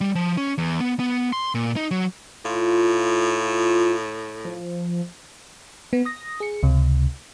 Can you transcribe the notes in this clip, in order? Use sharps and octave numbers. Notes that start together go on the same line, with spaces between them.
G3
F3
C#4
E2
B3
B3
C6
A#2
D#4
F#3
A2 F4
F3
B3
D#6 A#6
G#4 C#7
C#2 C3